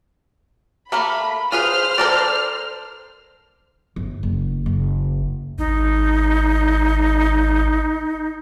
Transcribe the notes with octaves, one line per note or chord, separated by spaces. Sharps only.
A3 A#3 A#4 B5
F4 G#4 B4 C5 F6
A4 A#4 D5
G1
F#1
F#1
G#1 D#4